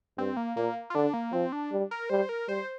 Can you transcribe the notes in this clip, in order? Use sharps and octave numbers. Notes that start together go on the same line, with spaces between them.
G2 C4
A#3
A#2 A#3
F4
D3 D4
A#3
F3 C4
D4
G3
A#4
G3 C5
A#4
G3 C5